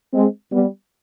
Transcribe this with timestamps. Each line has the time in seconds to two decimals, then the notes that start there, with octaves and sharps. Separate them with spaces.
0.13 G#3 C4
0.52 G3 B3